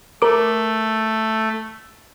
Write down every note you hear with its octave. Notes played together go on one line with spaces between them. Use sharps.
A3 A#4 D6